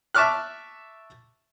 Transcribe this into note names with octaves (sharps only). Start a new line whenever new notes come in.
E5 A5 C#6 D6 F6 F#6